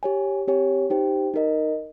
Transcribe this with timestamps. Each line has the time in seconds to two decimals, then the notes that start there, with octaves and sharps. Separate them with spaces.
0.03 G4 C#5 G#5
0.47 C4 G4 C#5 G#5
0.90 D#4 G4 C5 G5
1.34 D#4 A#4 D#5